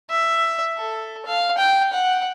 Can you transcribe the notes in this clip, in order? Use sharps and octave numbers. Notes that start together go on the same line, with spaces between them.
E5
A4
F5
G5
F#5